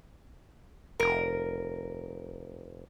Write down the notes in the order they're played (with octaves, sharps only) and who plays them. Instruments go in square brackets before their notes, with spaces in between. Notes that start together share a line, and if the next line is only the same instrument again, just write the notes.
[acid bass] F1 [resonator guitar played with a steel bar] A#4